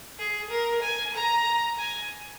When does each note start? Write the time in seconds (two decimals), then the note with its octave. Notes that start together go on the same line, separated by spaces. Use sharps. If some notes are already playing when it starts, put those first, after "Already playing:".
0.19 G#4
0.51 A#4
0.82 G#5
1.14 A#5
1.78 G#5